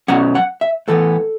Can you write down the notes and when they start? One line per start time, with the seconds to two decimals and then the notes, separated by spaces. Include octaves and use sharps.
0.08 B2 F#3 C#4 F#5
0.35 F#5
0.61 E5
0.88 A2 E3 B3 A4